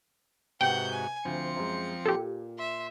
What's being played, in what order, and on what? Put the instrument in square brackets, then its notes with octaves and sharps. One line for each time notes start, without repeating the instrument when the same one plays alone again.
[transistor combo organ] G#2 F#4 [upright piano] C3 B4 [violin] F#5 G6 [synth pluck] G5
[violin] G#5
[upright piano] D2 [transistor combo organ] F3 C4 [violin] C#7
[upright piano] F#2 G#3
[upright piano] A#2 [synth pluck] G4 A4
[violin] E5 [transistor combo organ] C6